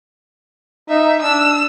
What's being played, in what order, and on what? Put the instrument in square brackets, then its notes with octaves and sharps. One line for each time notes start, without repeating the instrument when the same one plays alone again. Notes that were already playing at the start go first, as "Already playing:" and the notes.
[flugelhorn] D#4 [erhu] E5
[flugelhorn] D4 [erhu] E6